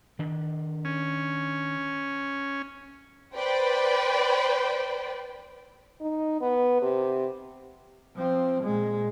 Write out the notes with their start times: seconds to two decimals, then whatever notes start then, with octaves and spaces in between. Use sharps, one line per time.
0.19 D#3 D4
0.85 C#4
3.36 B4 C5 D5 G5
6.01 D#4
6.41 B3
6.82 C3
8.16 F3 C4
8.63 A#2 G#3